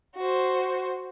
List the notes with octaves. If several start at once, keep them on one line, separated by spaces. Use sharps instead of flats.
F#4 C5